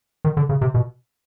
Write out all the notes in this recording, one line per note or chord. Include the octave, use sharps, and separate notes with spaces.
D#3
D3
C#3
C3
B2